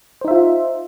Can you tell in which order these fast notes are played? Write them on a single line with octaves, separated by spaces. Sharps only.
C5 D#4 E5 F4